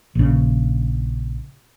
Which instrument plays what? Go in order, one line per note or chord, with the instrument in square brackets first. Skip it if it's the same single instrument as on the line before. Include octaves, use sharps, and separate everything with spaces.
[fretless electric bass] A#1 C#3